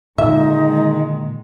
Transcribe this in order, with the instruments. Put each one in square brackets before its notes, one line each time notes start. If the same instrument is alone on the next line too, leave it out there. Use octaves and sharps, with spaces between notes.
[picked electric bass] A#2 D3 [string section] D#3 G#3 [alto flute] D#4 [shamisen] E5